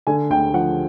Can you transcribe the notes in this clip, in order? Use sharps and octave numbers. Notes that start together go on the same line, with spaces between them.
D3 G#5
D2 G5
F3 F#5